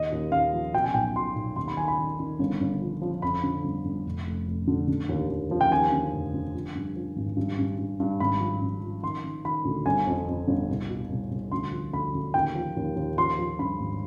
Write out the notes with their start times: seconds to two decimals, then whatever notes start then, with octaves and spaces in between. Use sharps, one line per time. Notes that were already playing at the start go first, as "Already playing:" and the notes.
Already playing: D#2 D#5
0.12 D#2
0.32 D#2 F5
0.53 F3
0.74 B2 G5
0.84 G#5
0.94 B1 G5
1.16 B2 C6
1.35 B1
1.56 D#2 C6
1.68 B5
1.77 D#3 G#5
1.88 B5
1.99 D#3
2.20 D#3
2.39 G1
2.60 G1
2.81 F3
3.02 F3
3.22 F2 B5
3.43 D3
3.63 G1
3.85 G1
4.06 F1
4.27 F1
4.48 F1
4.67 D3
4.88 D3
5.09 D#2
5.29 D#2
5.51 F3
5.61 G5
5.71 D#2 G#5
5.92 D3
6.12 F1
6.34 D3
6.55 F3
6.75 G2
6.96 F3
7.16 G#1
7.37 G2
7.58 G2
7.78 G2
8.00 G2
8.20 G#1 B5
8.40 F3
8.61 G2
8.82 F3
9.03 D#3 C6
9.24 D#3
9.45 D#3 B5
9.65 D2
9.86 G1 G#5
10.07 F2
10.28 F2
10.47 G1
10.69 C2
10.89 B2
11.10 C2
11.31 C2
11.52 D2 C6
11.72 F3
11.93 D2 B5
12.14 D2
12.34 D#2 G5
12.55 F3
12.77 D#2
12.96 D#2
13.17 F3 C6
13.39 F3
13.59 G2 B5
13.80 G#1